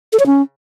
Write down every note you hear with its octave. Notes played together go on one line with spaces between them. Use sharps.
A4
C#5
C#4